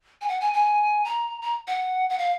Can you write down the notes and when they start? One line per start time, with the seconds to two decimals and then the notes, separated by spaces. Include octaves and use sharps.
0.21 G#5
0.28 F#5
0.40 G#5
0.54 G#5
1.05 A#5
1.42 A#5
1.67 F#5
2.10 F#5
2.18 F5